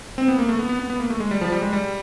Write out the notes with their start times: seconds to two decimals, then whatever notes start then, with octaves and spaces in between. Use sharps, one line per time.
0.18 C4
0.28 B3
0.38 A#3
0.49 A3
0.59 B3
0.69 B3
0.80 B3
0.90 B3
1.00 A#3
1.10 A3
1.20 G#3
1.31 G3
1.41 F3
1.52 G3
1.62 G#3
1.73 G3